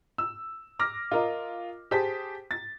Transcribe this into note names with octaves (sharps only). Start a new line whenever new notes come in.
E6
D6 F6 A#6
F4 A#4 D#5
G4 G#4 C5 A5 B6
A6